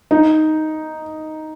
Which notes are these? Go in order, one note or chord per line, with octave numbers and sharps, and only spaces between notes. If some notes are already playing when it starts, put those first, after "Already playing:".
D#4